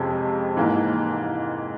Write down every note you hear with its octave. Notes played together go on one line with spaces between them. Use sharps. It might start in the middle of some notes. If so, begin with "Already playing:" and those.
Already playing: F2 C3 F3 G#3 C#4
G#2 E3 A#3